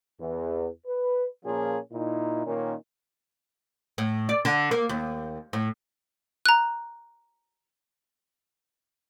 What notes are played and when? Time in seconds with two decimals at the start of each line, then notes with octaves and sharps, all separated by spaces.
0.20 E2
0.87 B4
1.45 A#2 F3 A#3 C#4 F4 G#4
1.92 A#2 D#4 E4
2.46 A#2 D#3 C#4
3.98 A2
4.29 D5
4.45 D3
4.71 A#3
4.89 D#2
5.53 A2
6.46 A#5 F#6